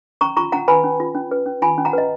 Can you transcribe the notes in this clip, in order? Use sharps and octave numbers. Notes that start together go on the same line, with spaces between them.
C#4 A#5 C#6
F4 A#5 C#6
C#4 F#5 A#5
B4 G#5 B5
C#4
F4
C#4
B4
C#4
F4 G#5 B5
C#4
F#5 A#5
B4 D#5